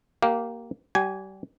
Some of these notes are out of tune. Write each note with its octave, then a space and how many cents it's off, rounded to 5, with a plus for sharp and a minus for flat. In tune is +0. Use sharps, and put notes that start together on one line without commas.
A#3 +0 G4 -20 F5 +0
G3 -30 G4 -35 G#5 +0